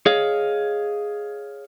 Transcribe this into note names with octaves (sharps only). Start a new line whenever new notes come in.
G#4 C#5 D#5 F5